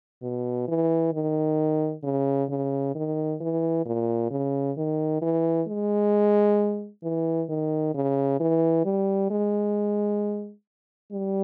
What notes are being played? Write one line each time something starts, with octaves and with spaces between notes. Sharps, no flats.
B2
E3
D#3
C#3
C#3
D#3
E3
A#2
C#3
D#3
E3
G#3
E3
D#3
C#3
E3
G3
G#3
G3